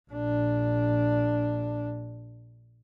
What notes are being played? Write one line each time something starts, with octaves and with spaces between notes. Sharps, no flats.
A#1 D4